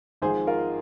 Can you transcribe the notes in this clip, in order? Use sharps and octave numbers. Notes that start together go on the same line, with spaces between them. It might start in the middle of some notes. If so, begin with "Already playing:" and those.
G#1 G#2 F3 G#3 G#4 C5
F4 A#4